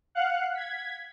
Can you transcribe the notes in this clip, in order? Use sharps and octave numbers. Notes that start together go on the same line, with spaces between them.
F5 F#5 F#6
G#6 B6